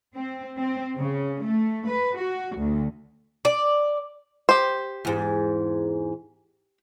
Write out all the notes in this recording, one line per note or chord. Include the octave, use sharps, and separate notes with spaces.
C4
C4
C#3
A3
B4
F#4
D2
D5
G4 C5
E2 G#2